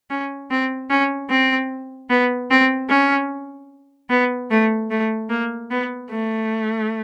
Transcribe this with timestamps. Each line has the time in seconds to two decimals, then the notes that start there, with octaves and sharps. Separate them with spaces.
0.10 C#4
0.51 C4
0.90 C#4
1.30 C4
2.10 B3
2.51 C4
2.90 C#4
4.10 B3
4.51 A3
4.90 A3
5.30 A#3
5.71 B3
6.10 A3